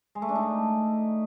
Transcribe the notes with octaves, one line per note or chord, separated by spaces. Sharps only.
G#3
A3
D4
D#4